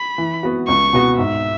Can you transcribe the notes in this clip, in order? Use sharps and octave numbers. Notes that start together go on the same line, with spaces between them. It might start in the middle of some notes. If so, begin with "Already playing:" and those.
Already playing: B5
E3
B3 F#4
C#2 C#6
B2 B3 F#4
G#2 E5